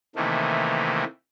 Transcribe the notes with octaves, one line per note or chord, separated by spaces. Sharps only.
C3 D#3 E3 A3 A#3